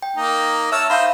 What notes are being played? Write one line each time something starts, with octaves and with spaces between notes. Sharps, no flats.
G5
A#3 D#4
C#5 E5 A5 E6 F6
D#4 C5 E5 F5 B5